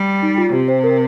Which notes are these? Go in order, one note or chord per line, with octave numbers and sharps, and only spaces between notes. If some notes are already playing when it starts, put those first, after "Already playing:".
Already playing: G3
D#4
F4
C3 G4
C5
A#4